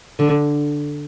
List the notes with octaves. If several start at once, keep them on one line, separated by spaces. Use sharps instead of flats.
D3